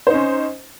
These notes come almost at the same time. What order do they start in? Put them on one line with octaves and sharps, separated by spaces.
C5 D#4 C#4